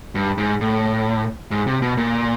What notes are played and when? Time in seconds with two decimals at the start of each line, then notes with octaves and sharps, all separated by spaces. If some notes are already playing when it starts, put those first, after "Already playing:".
0.15 G2
0.38 G#2
0.61 A2
1.51 G#2
1.67 C3
1.82 B2
1.97 A#2